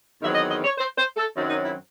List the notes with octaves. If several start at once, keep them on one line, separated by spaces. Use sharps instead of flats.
E2 D#3 F#3 C4 E5
D#5
D#5
C#5
C5
C5
A4
F#2 D#3 F#3 C4
D#4
E4